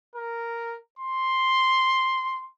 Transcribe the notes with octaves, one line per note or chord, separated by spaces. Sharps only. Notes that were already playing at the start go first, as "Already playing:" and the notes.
A#4
C6